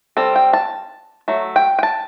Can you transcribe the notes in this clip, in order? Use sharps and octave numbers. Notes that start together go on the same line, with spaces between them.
G3 C4 A4
G5
A5
F#3 A3
G5
G5
A5